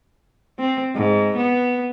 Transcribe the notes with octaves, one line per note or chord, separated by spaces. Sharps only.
C4
G#2
B3